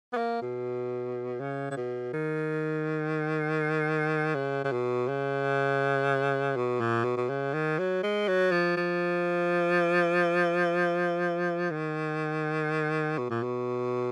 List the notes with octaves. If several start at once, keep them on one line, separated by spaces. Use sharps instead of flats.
B3
A#3
B2
C#3
C#3
B2
D#3
C#3
C#3
B2
C#3
B2
A#2
B2
B2
C#3
D#3
F#3
G#3
F#3
F3
F3
D#3
B2
A#2
B2